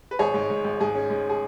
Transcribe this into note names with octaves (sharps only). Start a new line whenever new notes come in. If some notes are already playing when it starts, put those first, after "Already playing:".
B4
G#1 G#4 C#5
G#2
G#2
G#1
G#2 G#4
C#4
G#2
G#4